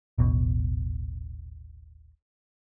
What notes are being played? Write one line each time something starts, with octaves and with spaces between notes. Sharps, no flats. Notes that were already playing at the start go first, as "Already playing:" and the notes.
D#1 A1 B2